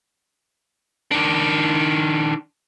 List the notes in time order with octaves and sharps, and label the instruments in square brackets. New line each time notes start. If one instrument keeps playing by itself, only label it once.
[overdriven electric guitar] D#3 D4